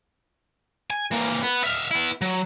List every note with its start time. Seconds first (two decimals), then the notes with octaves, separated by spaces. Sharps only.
0.90 G#5
1.11 E3 A#3
1.43 B3
1.64 E5 F5
1.91 B3 E4
2.22 F#3